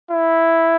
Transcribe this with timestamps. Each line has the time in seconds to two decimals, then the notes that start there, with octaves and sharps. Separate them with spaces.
0.11 E4